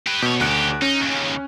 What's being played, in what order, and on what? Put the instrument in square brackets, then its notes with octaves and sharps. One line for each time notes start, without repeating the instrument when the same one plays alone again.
[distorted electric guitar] G4 B4
[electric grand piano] B2 [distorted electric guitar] G4 C#5
[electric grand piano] D2 F#6 D7 [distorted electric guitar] C#3 G4
[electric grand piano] C#4 [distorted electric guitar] D#4
[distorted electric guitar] D#2 C#3